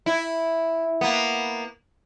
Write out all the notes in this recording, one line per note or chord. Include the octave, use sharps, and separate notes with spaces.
E4
A#3 B3